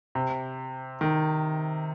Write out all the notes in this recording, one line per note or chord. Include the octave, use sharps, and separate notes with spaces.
C3
D#3